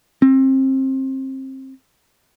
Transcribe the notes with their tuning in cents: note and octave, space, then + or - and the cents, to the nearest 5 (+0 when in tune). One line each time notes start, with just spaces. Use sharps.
C4 +25